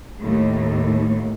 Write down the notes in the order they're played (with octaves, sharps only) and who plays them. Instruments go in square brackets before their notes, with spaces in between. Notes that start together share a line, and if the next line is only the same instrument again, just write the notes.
[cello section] D#2 A2